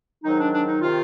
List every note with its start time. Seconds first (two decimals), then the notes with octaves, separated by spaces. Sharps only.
0.24 G#2 D#3 F#3 D#4
0.39 D4
0.53 D4
0.68 D#4
0.82 C3 D#3 F4